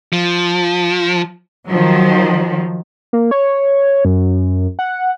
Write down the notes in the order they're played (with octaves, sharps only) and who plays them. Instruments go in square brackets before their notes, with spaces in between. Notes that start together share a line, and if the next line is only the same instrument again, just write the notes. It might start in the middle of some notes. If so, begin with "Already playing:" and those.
[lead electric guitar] F3
[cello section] D#3 F3 F#3
[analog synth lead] A#3
C#5
F#2
F#5